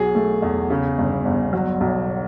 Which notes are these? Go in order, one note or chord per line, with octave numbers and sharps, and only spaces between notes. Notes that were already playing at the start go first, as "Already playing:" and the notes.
Already playing: B1 F#3 G#4
A3
E2
C#3
G1
G1
F#3
B1